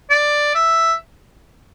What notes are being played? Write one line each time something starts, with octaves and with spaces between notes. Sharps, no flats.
D5
E5